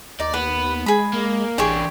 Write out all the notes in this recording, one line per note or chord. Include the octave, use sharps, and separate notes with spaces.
D#2 D#4 D5
D#2 B3 B4
G#3 G#4 B5
A#3
A1 E3 D4 G4 G#4 C#6